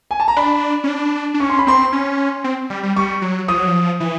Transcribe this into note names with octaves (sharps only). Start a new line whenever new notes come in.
G#5
A5
A#5
D4 B5
C#4
D4
D4
C#4 C#6
C6
B5
C4 C6
C#4
C4
G3
G3
G3 C#6
F#3
F3 D#6
F#3
F3
E3